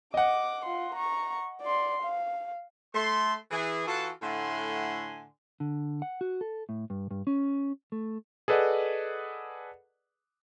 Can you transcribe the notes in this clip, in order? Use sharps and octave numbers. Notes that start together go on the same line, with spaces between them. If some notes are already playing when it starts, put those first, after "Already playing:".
D#5 F#5 D6
F4 C6
A#5 C#6
D5 C6
F5
A3 C6
E3 G#4
E3 F4 F#4 A4
A2 D3 A3 F#5 G#5 C6
D3
F#5
F#4
A4
A2
G2
G2
C#4
A3
G#4 A4 B4 D5 D#5 F#5